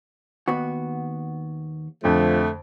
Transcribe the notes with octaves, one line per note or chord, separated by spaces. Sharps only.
D#2 B3 F#4
F2 D3 F3 A3